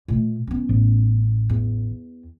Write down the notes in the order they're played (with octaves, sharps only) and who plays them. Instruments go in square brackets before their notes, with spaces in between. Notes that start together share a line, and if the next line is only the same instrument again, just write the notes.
[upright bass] A#2 A3
B3 C#4
[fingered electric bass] A1
[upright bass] E2